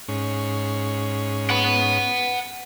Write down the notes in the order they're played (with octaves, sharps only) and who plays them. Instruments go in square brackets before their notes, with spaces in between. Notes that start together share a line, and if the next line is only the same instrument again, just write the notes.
[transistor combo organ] G#2 C#4
[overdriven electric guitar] F#5 B5